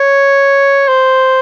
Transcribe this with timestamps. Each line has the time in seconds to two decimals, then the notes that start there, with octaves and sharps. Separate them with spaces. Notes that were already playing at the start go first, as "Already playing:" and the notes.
Already playing: C#5
0.88 C5